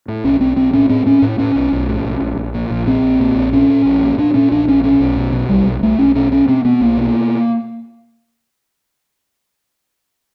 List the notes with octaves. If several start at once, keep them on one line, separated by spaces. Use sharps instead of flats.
A2
B1 C#4
B1 C4
B1 C4
A2 C#4
A2 C4
A2 C#4
A2
A2 C#4
B1
B1
A2
B1
A#1
A#1
A#2
A#1
A#2 C4
A#1
A#2
A#1
A#2 C#4
A#2
A#1
A#2
A#2 D4
A#2 C#4
A#1 D4
A#1 C#4
B2 C#4
B1
B2
B2
B1 G3
B1
B1 A3
B1 C#4
B2 C#4
B2 C#4
B2 C4
B2 B3
B1 A#3
B2